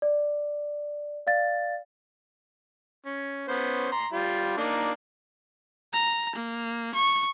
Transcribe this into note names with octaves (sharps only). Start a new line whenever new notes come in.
D5
D5 F5 A6
C#4
B3 C#4 C5
A#5 C6
G3 F4
A#3 D4 D#4
A#5
A#3
C#6